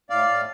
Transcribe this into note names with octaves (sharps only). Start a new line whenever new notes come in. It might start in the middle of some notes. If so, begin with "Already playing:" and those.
A2 D5 F5
A2